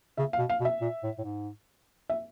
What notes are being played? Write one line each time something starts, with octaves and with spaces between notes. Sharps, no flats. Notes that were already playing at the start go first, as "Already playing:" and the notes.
C#3 E5
F5
B2
F5
B2
E5
A#2
A2
A2
G#2
E5